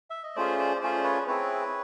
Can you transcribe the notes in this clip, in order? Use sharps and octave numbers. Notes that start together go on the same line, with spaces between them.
E5
D#5
A3 C#4 F4 G#4 C5 D5
C5 D5
A3 C#4 F4 G#4 C5 D5
B4 C#5
C4 E4 G#4 B4 C#5